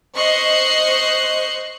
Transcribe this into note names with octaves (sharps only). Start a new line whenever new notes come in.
C5 D#5 C#6 F#6 C7